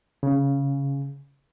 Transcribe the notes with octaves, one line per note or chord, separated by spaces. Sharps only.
C#3